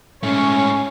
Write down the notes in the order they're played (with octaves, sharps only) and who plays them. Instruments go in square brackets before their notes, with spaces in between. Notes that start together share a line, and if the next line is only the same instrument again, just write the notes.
[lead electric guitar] G#2 A3 [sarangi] C#4